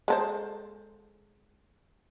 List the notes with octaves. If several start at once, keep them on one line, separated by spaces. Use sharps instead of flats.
G#3 A4 C5